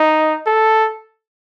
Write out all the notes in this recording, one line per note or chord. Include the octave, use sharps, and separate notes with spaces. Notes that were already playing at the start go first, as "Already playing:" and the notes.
Already playing: D#4
A4